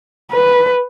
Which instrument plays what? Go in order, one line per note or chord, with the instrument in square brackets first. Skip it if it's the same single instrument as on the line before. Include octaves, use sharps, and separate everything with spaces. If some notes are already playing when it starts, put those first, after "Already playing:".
[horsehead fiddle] B4